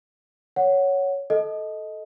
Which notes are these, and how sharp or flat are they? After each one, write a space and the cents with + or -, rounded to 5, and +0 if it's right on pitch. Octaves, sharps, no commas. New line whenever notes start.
C#5 +5 F#5 +0
A4 -10 D#5 +10